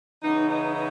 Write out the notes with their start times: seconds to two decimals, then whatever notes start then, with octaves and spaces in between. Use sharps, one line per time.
0.22 C#3 E3 B3 D#4
0.48 D#4
0.75 D#4